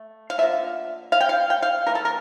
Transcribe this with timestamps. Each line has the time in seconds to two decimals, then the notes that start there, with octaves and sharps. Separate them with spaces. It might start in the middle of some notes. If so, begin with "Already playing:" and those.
Already playing: A3
0.30 F5
0.38 D3 F3 A#3 E5
1.12 F5
1.21 G5
1.29 F5
1.50 G5
1.62 F5
1.87 E3 A#3 A#4
1.95 A4
2.05 A#4